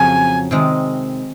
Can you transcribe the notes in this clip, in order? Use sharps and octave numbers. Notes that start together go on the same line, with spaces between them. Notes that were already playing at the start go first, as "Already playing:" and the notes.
Already playing: F2 C#3 F#3 G#5
C3 D#3 G#3